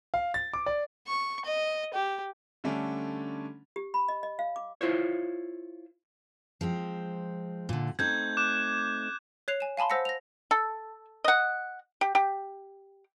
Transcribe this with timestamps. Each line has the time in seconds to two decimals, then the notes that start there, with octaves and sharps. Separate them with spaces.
0.14 F5
0.34 A6
0.54 D6
0.66 D5
1.07 C#6
1.45 D#5
1.94 G4
2.64 D3 G3 A3 C#4 D4
3.76 G4
3.94 B5
4.08 D#5
4.23 D#5
4.39 F5
4.56 D6
4.81 E4 F4 C5 C#5
6.61 F3 G#3 C4
7.69 A#2 D3
7.99 A3 C4 D#4 G6 G#6
8.37 D6 F#6 E7
9.48 C#5 F#6 C7 F7
9.60 G#5 E7
9.77 F5 G#5 A5 B5 C6
9.90 C5 F#5 E6 A#6 B6 C#7
10.05 A#6 F7
10.51 A4
11.24 D#5 F#5
12.01 G4
12.15 G4